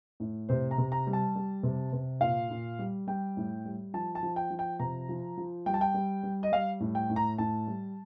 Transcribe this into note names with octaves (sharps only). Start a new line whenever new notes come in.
A2
C3 C5
A#5
C3
A#5
G3
A5
G3
C3
C3
A#2 F5
A#2
G3
G3 G5
A2
G3
F3 A5
A5
F3
G5
F3
G5
C3 A#5
F3
F3
G3 G5
A5
G5
G3
G3
D#5
G3 F5
A2
G5
A2
A#5
A2 A5
G3